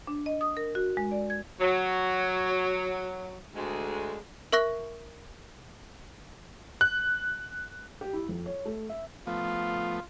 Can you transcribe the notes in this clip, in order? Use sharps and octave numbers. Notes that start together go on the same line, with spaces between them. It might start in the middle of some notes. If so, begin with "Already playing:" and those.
D4
D#5
D#6
A#4
F#4
G#3
D5
G#6
F#3
D2 G#3
A#4 E5 C#6 F#6 A#6
F#6
G4
E4
F2
C#5
A3
E5
F3 A3 B3 F4